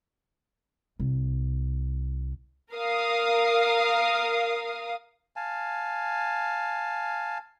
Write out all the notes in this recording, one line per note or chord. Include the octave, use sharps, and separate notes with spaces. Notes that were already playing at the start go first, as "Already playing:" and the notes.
C2
A#4 F5 D#6
F5 G#5 A5